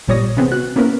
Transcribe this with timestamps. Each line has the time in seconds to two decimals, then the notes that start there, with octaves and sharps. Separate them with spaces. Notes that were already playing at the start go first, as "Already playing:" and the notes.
0.08 A1 A#2 G3 C#5 D#6 A#6
0.37 C3 E3 B3 C4 G#4
0.52 F#4 F#6
0.76 A#3 B3 C#4 E4 A#4 B4